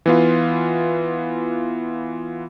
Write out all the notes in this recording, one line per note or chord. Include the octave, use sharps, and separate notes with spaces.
E3 B3 F4